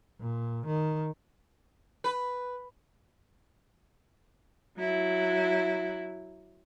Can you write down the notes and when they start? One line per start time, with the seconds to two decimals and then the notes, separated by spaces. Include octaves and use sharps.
0.20 A#2
0.66 D#3
2.04 B4
4.78 F#3 E4